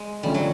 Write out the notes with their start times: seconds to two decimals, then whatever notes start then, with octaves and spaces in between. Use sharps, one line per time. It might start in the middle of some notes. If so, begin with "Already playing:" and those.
Already playing: G#3
0.23 D3 F3 G3 A3 C#4
0.34 F#3